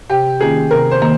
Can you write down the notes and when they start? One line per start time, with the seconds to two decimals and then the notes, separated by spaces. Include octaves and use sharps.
0.10 C3 G4
0.40 D#3 A#3 C#4 F4 G#4
0.71 C3 A#4
0.91 C5
1.02 D#3 A#3